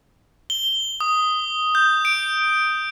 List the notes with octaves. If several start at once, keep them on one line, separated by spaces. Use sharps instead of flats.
G7
D#6
G6
D7